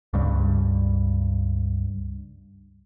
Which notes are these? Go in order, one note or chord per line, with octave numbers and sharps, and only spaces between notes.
C#2 G2